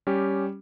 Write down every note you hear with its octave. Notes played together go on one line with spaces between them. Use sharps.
G3 C#4 G4